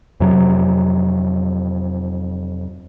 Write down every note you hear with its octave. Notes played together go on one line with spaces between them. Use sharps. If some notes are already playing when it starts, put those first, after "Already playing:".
F2 C3 F#3